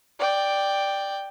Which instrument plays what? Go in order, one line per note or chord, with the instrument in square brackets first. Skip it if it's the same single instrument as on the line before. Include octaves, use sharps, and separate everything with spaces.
[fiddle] D5 G5